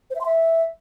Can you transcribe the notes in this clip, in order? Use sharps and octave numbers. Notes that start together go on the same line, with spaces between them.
C5
E5
C6
E5